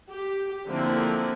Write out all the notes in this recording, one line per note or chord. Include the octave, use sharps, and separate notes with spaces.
G4
D3 F3 A#3 C4 E4